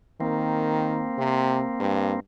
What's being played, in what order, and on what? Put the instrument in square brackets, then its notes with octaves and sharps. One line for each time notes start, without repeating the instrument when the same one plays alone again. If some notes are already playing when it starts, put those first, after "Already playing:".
[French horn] D#3 [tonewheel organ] A#3 C4
[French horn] C3
G2